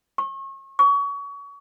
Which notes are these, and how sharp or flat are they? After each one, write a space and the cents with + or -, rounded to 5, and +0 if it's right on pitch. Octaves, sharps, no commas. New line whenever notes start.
C#6 -35
C#6 +30